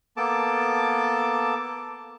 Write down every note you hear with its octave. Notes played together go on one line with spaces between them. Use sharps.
A#3 B3 A4 A5 D6